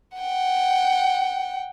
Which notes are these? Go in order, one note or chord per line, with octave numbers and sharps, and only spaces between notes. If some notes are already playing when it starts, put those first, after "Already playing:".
F#5 G5